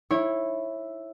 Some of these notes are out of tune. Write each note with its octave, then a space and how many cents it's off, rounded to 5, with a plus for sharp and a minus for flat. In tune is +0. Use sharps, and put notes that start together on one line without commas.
E4 +0 C#5 -25